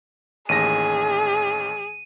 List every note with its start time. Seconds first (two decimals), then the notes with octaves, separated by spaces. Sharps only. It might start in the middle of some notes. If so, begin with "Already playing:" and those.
0.49 A1 D#2 G#4 A#6 D#7